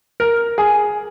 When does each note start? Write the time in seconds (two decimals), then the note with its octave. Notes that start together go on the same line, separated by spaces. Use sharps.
0.20 A#4
0.58 G#4